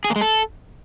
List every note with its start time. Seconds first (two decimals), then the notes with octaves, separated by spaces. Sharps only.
0.04 G#4
0.10 A#3
0.16 G#3
0.21 A4